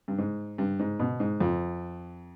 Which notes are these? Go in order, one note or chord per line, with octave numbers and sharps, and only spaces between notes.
G2
G#2
G2
G#2
B2
G#2
F2